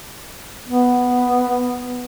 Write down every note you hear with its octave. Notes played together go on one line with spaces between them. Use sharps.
B3